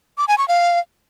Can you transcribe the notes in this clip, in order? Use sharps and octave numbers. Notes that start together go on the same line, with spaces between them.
D6
G#5
C#6
F5